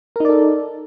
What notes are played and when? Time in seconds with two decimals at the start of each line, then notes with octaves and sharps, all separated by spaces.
0.16 A#4
0.20 D#4
0.25 D5
0.29 A4